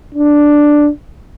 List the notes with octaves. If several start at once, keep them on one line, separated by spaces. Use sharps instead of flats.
D4